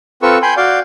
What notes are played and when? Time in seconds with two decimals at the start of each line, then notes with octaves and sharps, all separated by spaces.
0.23 C4 F4 A4 B4 C#6 E6
0.42 G5 G#5 B5 C6 G6
0.57 F#4 D5 F5 G6